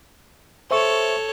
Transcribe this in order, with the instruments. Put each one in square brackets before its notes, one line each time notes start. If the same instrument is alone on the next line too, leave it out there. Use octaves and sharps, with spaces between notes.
[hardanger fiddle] A4 C#5 [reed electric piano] C5 E5 C#6